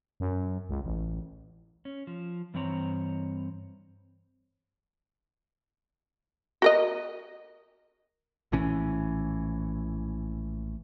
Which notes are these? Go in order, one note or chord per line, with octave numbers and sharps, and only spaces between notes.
F#2
C#2
A1
C#4
F3
G2 E3 C4 C#5 A#5
F#4 A#4 D#5
A#1 A2 E3 C#4